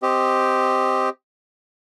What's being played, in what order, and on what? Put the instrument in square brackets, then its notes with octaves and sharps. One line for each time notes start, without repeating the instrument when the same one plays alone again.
[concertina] C4 G4 D#5